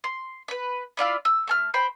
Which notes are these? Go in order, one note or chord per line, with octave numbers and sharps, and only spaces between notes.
C6
B4 B5
E4 F4 D5 B5
E6
A3 G#5 F6
C5 G5 B5